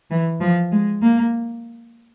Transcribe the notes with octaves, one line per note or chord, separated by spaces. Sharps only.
E3
F3
G#3
A#3